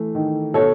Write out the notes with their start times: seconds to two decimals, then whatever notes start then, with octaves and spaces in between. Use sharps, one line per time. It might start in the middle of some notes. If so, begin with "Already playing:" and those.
Already playing: E3 A3
0.15 D#3
0.54 B2 A4 C#5